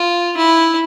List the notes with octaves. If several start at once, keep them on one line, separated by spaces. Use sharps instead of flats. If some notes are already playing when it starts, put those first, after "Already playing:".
Already playing: F4
E4